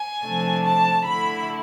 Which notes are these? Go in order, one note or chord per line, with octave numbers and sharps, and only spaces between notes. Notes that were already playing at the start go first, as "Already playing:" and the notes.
Already playing: G#5
C3 F3 A3 D4
A5
D3 A3 E4 B5